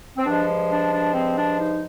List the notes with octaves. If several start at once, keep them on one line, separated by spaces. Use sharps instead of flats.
C4
G2 F3 G#3 D4
D4
D4
C4
D4
D#4